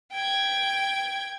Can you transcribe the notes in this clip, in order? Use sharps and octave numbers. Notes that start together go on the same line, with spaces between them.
G5 G#6